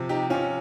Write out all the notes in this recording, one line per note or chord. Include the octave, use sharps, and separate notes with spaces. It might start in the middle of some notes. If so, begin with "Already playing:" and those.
Already playing: C3 F3
D#4 G4
C3 F3 C#4 F4